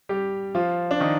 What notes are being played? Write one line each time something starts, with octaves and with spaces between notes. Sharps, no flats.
G3 G4
F3 F4
D4
D#3 D#4